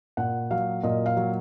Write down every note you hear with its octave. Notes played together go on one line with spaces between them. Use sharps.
A#2 F#5
F#3 F5
A#2 D#5
F5
F#3